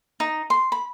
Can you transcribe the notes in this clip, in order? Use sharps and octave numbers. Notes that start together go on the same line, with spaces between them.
D#4
C6
B5